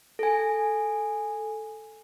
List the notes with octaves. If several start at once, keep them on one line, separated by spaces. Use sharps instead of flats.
A4 G#5